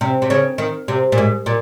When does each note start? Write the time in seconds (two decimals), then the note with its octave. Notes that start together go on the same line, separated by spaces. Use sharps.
0.01 C3
0.22 C3
0.30 C#3
0.58 D#3
0.88 C3
1.12 A#2
1.18 G#2
1.46 A#2